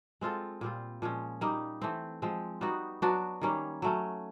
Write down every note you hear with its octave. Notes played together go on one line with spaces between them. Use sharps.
G#3 C4 F4 A4
A#2 G3 C4 F4
A#2 F3 G#3 C#4
G3 A#3 D#4
E3 A3 C4
F3 G#3 C4
G3 B3 D#4 F#4
F#3 B3 D4 F#4
D#3 G3 A#3 C#4
F#3 A3 C#4